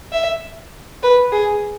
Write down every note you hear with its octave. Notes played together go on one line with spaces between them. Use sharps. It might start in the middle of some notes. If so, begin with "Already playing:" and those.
E5
B4
G#4